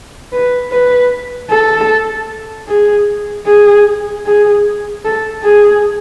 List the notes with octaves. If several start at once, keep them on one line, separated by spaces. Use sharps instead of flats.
B4
B4
A4
G#4
G#4
G#4
A4
G#4